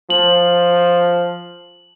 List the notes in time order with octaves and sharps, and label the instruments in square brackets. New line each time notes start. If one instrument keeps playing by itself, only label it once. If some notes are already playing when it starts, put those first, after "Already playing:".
[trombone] F3 [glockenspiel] F#7